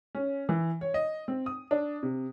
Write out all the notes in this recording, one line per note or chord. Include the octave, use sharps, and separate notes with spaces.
C#4
E3
C#5
D#5
C4
D#6
D4
C3